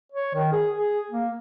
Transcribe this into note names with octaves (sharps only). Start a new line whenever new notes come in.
C#5
D#3
G#4
G#4
A#3